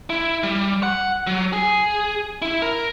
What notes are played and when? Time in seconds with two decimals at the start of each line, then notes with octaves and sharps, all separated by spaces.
0.10 E4
0.43 G3
0.83 F#5
1.27 F#3
1.53 G#4
2.42 E4
2.62 A#4